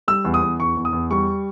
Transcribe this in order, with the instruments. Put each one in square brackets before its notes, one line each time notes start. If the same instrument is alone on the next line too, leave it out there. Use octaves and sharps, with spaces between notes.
[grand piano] G3 E6
E2
D#6
E2
E2 C#6
E2
D#6
E2
G3 C#6